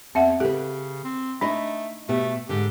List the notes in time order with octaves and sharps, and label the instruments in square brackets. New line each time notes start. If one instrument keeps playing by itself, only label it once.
[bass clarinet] E2 [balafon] C4 E5 F#5
[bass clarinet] C#3 [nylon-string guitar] G4 B4 [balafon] A4
[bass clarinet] C4
[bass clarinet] A3 [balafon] D4 [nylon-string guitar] D#4 D#5
[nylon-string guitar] B2 B3 G4 [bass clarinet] A3
[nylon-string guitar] G#2 D3 [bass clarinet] G4